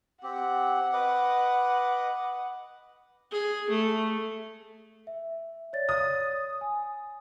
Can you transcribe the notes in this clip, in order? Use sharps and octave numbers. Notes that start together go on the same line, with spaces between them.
C4 G4 F#5
B4 D#5 D6
G#4
A3
E5
C#5 D5 A6
D#6
G#5